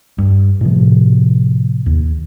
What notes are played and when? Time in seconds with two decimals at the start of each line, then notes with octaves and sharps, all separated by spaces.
0.18 G2
0.61 A2 C3 F3
1.86 D#2